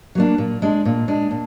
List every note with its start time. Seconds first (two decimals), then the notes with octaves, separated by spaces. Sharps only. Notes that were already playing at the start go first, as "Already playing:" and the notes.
0.15 F#3 A#3 D4
0.38 A#2
0.62 G#3 D4
0.85 A#2
1.08 G#3 D4
1.31 A#2